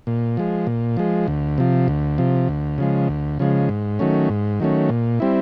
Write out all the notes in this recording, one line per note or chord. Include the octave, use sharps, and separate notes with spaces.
A#2
F3 G#3
A#2
F3 G#3
D2
C3 F3
D2
C3 F3
D2
C#3 F3 G#3
D2
C#3 F3 G#3
G#2
D#3 F#3 A3 C#4
G#2
D#3 F#3 A3 C#4
A#2
G3 C4 E4